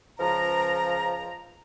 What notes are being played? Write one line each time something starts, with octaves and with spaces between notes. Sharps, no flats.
C#2 F3 A#5